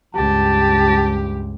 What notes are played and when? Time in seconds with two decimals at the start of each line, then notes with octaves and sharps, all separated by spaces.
0.15 C#2 G2 G4 A5